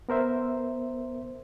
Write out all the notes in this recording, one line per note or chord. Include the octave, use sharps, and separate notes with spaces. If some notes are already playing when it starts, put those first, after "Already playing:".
B3 A#4 C5 E5